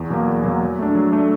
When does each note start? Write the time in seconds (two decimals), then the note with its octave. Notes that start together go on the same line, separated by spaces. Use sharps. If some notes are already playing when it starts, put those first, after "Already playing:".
Already playing: E2
0.10 B2 F#3 A#3
0.28 E2
0.44 B2 F#3 A#3
0.61 F#3
0.79 A3 D4
0.95 F#3
1.12 A3 D4